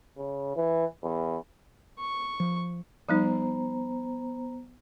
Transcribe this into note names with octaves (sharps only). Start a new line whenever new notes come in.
C#3
E3
E2
C#6
F3
F3 G3 B3 D#4 C5 A#5